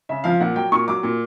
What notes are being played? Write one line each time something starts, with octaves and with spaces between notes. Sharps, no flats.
C#3 E5
F3 F5
A#2 F#5
F#3 G5
A#2 C#6
F#3 D6
A#2